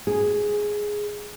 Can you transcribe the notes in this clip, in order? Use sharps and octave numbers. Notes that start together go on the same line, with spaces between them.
G#4